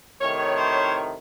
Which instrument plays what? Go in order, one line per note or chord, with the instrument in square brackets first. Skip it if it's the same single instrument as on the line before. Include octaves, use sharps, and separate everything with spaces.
[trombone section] A2 C3 D#3 [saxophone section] C#5
[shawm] C5